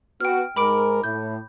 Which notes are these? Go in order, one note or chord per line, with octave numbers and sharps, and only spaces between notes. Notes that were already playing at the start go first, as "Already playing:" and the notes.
B3 F#4 G5 F6
G#2 G#3 A#4 B5 D6 D7
A2 G6